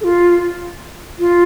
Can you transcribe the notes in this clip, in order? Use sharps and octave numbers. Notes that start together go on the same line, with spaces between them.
A4
F4
F4